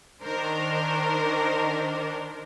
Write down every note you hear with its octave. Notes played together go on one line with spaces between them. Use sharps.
D#3 D4 A#4 C5